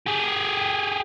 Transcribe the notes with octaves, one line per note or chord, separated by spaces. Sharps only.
G4 G#4